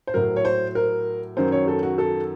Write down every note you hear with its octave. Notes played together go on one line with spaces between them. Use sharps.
C5
A2 F#3 A#4
C#5
C5
A#4
F#2 D#3 F#3 C5
C#5
A4
F#4
A4